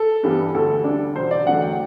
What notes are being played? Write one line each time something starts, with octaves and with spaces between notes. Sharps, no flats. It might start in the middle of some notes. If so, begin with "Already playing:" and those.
Already playing: A4
G2 E3 G3 B3
D2 A4
D3 G3 D4
E1 C5
D5
E2 D3 F#3 A3 F#5
G5